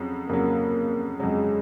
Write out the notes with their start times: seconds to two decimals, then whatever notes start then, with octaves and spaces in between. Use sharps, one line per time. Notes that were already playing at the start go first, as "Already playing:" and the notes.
Already playing: F2 C#3 F#3
0.29 F2 C#3 F#3 A#3
1.20 F2 C#3 F#3 G#3